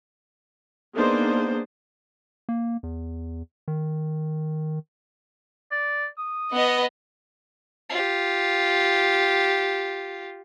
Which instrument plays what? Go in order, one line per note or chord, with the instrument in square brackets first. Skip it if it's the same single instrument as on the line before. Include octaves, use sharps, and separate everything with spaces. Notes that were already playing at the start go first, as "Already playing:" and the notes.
[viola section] A#3 B3 D4 D#4 G#4 C5
[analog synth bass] A#3
E2
D#3
[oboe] D5
D#6
[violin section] B3 D#5
[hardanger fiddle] F4 G4